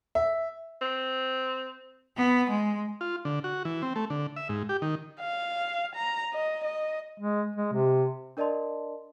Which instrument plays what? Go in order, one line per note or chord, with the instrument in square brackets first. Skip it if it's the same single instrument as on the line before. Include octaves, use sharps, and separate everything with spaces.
[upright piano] E5
[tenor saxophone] C4
[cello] B3
G#3
[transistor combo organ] F4
D3
F#4
E3
C4
A3
D3
E5
G#2
G4
D#3
[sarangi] F5
A#5
D#5
D#5
[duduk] G#3
G#3
C3
[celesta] D4 A#4 D5 D#5 A5 C6